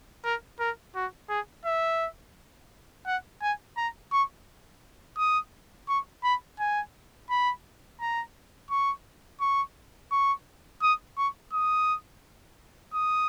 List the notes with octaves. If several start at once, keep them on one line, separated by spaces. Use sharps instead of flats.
A#4
A#4
F#4
G#4
E5
F#5
G#5
A#5
C#6
D#6
C#6
B5
G#5
B5
A#5
C#6
C#6
C#6
D#6
C#6
D#6
D#6